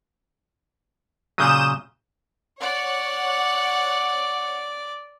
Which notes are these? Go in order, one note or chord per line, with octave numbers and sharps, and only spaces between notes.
A#2 C#3 F#3 D#6 G6 E7
C#5 D5 F#5